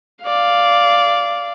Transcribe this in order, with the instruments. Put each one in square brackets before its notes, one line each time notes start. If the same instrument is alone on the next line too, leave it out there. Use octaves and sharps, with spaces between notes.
[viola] D5 F5